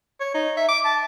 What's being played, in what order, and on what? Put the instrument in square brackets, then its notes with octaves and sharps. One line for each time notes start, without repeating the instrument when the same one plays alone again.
[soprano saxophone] C#5
D#4
E5
D6
A5